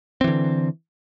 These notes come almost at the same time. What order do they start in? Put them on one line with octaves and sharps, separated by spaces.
C4 E3 D3